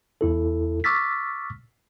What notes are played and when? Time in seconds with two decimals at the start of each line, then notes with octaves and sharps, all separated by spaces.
0.21 E2 E4 A4
0.84 C#6 D6 E6 F6 A6 B6